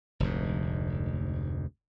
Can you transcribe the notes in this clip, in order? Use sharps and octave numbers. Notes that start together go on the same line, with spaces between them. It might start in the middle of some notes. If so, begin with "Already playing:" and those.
F1 D2 G#2